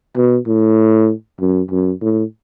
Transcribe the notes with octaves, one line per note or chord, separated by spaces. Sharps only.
B2
A2
F#2
F#2
A2